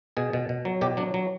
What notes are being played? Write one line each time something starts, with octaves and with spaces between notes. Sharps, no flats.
B2 G#4
B2
B2
F#3
B2 G4
F#3 D4
F#3